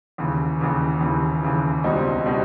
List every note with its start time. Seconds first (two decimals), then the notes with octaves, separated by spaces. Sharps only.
0.18 D#2 C#3 E3
0.59 D#2 C#3 E3
1.01 D#2 C#3 E3
1.42 D#2 C#3 E3
1.84 C#2 B2 G3 C4 D#4
2.26 B2 G3 C4 D#4